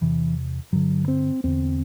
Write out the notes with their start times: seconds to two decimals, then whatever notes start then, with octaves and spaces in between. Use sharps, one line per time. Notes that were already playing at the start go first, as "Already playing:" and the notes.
0.01 E2 C3 E3
0.72 G2 D3 F#3
1.08 C4
1.44 E2 D3 C4